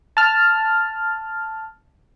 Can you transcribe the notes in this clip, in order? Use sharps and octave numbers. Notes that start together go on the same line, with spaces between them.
A5 F6